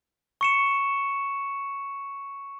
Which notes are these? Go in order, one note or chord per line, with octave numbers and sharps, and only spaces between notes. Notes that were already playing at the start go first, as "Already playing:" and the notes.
C#6 C#7 E7